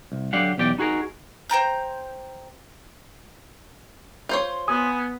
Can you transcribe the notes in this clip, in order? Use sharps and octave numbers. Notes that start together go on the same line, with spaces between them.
C2
D3 F#3 D4 G4 F5 F#5
B1 E2 G4 D5 G5
D#4 F#4 G#4 A#4
C5 G5 A#5 G6
F4 C5 C#5
B3 G#5 D#6